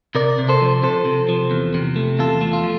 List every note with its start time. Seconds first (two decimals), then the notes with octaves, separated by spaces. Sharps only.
0.15 C3 A#4 D5
0.39 C3
0.49 A4 C5
0.61 F3
0.83 C3 A4 C5
1.05 C3
1.29 F3
1.51 E2
1.74 C3
1.96 A3
2.19 E2 F4 A4
2.41 A3
2.53 F4
2.64 F3